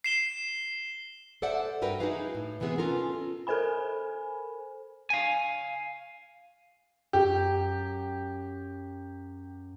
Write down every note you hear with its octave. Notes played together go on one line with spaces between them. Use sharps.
C7 E7 G7
A4 C5 D5 E5 F#5
G2 F#4 A#4 B4 G5
D#4 E4 F#4 G#4 B4 F5
A2
C3 E3 G#3 B3 G#4
C#4 F4 A4 A#4
A4 A#4 C5 G#5 B5
F5 G#5
F#2 G4